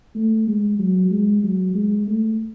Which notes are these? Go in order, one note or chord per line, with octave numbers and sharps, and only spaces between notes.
A3
G#3
F#3
G#3
F#3
G#3
A3